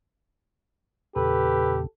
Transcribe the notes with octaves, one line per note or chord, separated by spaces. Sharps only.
E2 A#2 C#3 G4 A4 B4